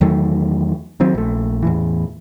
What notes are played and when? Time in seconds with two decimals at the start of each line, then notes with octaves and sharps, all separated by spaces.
0.01 E2 D#3 F#3 A3
1.00 D#3 F#3 C4
1.15 A#1 A3
1.62 E2 A2 E3